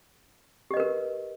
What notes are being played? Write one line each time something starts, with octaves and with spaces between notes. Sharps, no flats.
G4 A#4 B4 D#5